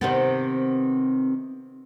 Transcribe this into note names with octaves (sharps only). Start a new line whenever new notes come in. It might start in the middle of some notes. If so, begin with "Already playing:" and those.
C3 D#3 B3